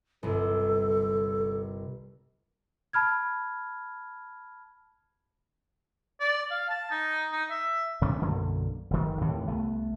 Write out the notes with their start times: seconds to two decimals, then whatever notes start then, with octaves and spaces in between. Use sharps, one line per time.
0.23 G1 C2 A4
2.93 A5 B5 F6 G#6
6.20 D5
6.51 F5
6.69 A5
6.91 D#4
7.32 D#4
7.50 E5
8.02 D2 C3 C#4 D4
8.21 B1 F#2 D3 A#3
8.91 G1 D#3
9.21 D#2 A2 C3 E3
9.48 C2 A3 B3